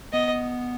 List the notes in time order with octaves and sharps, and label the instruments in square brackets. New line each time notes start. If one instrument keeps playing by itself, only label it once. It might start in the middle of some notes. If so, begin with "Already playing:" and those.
[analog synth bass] B3 [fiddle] D#5